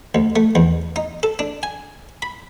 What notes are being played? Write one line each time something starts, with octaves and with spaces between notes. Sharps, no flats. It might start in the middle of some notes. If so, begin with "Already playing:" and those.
D2
A3
E2
D#4
A4
D4
G#5
B5